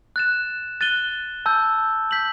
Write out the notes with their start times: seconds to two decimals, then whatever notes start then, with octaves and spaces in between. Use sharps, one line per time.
0.16 F#6 A6 E7
0.81 F#6 A6 D#7 G7
1.46 A5 E6 G6
2.11 G6 B6 F#7